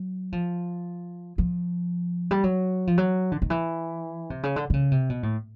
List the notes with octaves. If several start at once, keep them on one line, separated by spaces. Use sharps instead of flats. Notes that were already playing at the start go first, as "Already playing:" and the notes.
Already playing: F#3
F3
F3
G3
F#3
F3
F#3
D3
D#3
E3
C3
C#3
D3
D3
C#3
C3
B2
A2